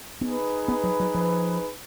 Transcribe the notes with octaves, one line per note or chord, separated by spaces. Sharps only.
B3 D#4 G#4 B4
B3
F#3
F#3
F3